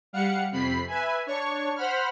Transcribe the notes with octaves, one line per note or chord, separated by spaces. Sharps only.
G3 F5 F#5 C#7
F2 C3 B5 C7
B4 E5 G#5
D4 C#5 C#6
C5 F#5 B5 F6